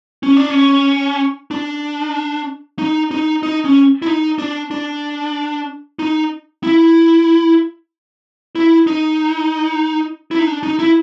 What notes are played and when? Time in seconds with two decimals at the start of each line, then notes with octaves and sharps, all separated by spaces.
0.23 C#4
0.37 D4
0.50 C#4
1.51 D4
2.79 D#4
3.11 D#4
3.43 D#4
3.65 C#4
4.02 E4
4.07 D#4
4.39 D4
4.71 D4
5.99 D#4
6.63 E4
8.55 E4
8.87 D#4
10.31 E4
10.39 D#4
10.47 D4
10.63 D#4
10.79 E4